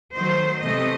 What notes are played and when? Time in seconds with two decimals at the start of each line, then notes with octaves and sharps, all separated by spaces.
0.15 D#3 F#3 A3 C5
0.62 C3 E3 A3 D#5